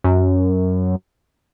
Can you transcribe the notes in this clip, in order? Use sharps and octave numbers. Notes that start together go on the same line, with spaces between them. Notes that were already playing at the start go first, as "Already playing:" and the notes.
F#2